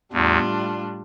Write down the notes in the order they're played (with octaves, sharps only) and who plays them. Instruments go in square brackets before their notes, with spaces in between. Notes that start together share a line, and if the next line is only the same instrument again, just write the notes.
[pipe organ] E2 [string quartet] A2 G3 D4 F4